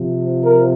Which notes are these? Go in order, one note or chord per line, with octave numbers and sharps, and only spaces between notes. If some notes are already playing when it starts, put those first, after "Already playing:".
Already playing: C3 F3
A#4